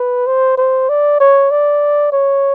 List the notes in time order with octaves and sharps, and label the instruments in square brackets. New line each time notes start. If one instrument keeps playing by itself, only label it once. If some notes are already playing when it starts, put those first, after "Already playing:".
Already playing: [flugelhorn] B4
C5
C5
D5
C#5
D5
C#5